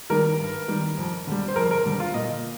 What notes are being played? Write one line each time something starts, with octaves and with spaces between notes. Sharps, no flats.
D#3 G3 A#4
G2
D#3 G3
F2
D3 G3
C5
F2 A#4
A#4
D3 G3
F4
A#2 D#5